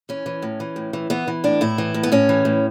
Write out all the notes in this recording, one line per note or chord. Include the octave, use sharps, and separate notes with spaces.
E3 C#4
E3
A2
E3
A2
E3
E3 B3
E3
A2 D4
A2 E4
E3
A2
B3
A2 C#4
E3
A2